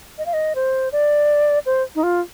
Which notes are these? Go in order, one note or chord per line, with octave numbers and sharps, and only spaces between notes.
D#5
F5
D#5
C5
D5
C5
D#4
F4